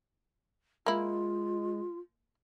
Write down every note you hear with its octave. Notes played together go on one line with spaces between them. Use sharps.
G#3 A#3 E4 F4